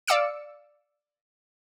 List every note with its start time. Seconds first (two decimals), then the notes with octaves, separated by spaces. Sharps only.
0.07 D5 F5 D6 E6 C#7